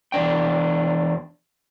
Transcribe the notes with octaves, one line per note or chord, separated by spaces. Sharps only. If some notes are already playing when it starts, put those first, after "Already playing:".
E2 C4 D4 G5